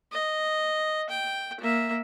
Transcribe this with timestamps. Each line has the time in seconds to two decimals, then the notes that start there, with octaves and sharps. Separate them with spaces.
0.12 D#5
1.09 G5
1.60 A#3 E5